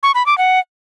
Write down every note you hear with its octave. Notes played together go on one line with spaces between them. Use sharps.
C#6
B5
D6
F#5